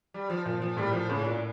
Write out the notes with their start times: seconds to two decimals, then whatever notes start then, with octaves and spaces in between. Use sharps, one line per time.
0.14 G3
0.30 F3
0.45 A#2 F3
0.62 F3
0.77 A2 G3
0.93 F3
1.09 A2 C#3
1.24 A#2